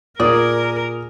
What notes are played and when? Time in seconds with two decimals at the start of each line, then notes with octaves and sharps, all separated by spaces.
0.20 A#2 G#4 A#4 D5 D#6